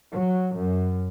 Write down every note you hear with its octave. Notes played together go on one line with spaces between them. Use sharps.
F#3
F#2